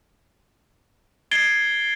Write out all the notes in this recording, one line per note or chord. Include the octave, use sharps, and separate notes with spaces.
G#6 A6 C7 D7 G7